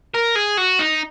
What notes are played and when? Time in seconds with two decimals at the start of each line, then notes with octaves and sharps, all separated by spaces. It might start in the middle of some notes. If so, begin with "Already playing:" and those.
0.14 A#4
0.35 G#4
0.57 F#4
0.79 D#4